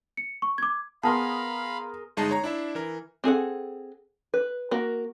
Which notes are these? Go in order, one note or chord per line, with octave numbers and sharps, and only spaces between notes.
C#7
C#6
D6 G#6
B3 G#4 A#4 F5 A5 B5 C6
G1 G#3 D#4 D#5 A5 C7
C#5 A#5
D4 E4 E5
E3 A#4
C4 G#4 A4 F#5
B4
A#3 F#4 A#4